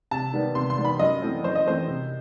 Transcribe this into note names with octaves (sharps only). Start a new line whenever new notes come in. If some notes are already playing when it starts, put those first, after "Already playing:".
C3 A5
D#3 G3 B3
C3 C6
C6
D#3 G3 B3
B5
F#2 D#5
E3 A3 C4
F#2 C5
D#5
E3 A3 C4 C5
C3